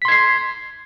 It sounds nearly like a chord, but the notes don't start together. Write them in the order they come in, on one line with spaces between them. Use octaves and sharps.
B6 C6 G#6 C7